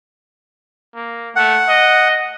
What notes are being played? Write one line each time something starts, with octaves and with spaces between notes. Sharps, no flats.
A#3
A3 F#5
D#5